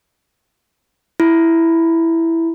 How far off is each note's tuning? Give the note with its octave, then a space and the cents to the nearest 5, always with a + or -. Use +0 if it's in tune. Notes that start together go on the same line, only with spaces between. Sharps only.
E4 +0 B5 +5